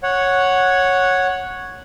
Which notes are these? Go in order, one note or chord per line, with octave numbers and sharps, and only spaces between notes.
C#5 F#5